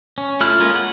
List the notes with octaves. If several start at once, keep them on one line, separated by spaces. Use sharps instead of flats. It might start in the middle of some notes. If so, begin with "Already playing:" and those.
C#4
A3 E4 F4 F6 F#6
G#3 A#3 C#4 F4
F#5